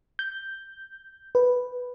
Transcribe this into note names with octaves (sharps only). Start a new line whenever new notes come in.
G6
B4